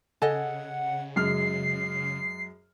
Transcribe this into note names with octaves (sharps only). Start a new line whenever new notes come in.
C#3 A4 D#5 F#5 G#5
F#2 G#3 F6 C7